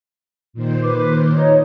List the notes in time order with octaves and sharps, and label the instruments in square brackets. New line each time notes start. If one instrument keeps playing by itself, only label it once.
[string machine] A#2 D#3 C5
[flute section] B4 D6
D#4 C#5